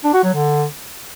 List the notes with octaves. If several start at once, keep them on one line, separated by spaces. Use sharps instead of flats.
D4
F#4
F#3
D3